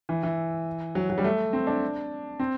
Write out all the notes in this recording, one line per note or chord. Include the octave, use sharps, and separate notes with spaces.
E3
E3
F#3
F#3
G3
A3
C4
D4
C4